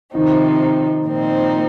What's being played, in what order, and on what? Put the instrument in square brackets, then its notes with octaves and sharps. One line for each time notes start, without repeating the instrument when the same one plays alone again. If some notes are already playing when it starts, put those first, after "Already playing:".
[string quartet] C3 F3 C4 D#4 [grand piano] D#3
[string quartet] A#2 F3 C4 D#4